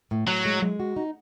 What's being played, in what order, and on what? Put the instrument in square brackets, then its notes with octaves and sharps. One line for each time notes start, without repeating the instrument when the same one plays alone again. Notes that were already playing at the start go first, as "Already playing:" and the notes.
[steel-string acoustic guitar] A2
[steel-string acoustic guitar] A2 [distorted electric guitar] F#3
[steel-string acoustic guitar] G#3
G#3
F#4
D#4